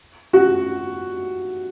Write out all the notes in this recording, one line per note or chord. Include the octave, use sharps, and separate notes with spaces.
F#4